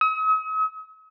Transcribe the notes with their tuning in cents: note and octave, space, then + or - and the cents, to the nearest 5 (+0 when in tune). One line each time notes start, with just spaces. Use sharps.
D#6 +45